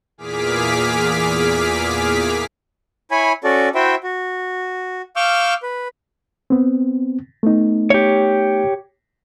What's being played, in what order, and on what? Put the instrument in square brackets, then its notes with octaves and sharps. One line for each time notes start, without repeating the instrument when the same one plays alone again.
[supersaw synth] E2 A#2 G#4 D6 F6 B6
[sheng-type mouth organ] E4 C#5 G#5 B5
C#4 F#4 A4 D5
E4 F#4 C5 E5 G5
F#4
F5 C#6 D6 E6 F6 G6
B4
[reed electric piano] B3 C4
A3 B3 D#4
[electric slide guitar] G4 C#5